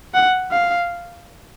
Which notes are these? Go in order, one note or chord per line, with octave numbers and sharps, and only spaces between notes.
F#5
F5